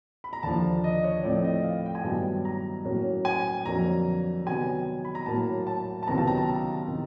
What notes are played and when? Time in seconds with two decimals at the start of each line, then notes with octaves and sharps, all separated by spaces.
0.24 B5
0.33 A#5
0.43 D#2 D3 F3 A5
0.84 D#5
1.04 C#5
1.23 A2 F3 A3 C4 D5
1.44 D#5
1.64 F5
1.86 G5
1.95 G#5
2.04 G2 D#3 F#3 B3 A5
2.45 A#5
2.85 A2 F#3 A#3 C#4
3.25 G#5
3.66 F2 D3 F#3 A#3 A#5
4.46 C3 D#3 F#3 B3 G#5
5.05 B5
5.15 A#5
5.26 A2 F#3 A#3 A5
5.67 A5
6.03 A5
6.07 C#2 C3 D#3 F#3 B3 A#5
6.18 A5
6.27 A#5
6.38 A5
6.88 C3 D#3